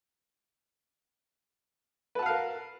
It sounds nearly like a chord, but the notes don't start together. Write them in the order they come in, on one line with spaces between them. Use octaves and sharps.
B4 A5 F#5 F5 A#4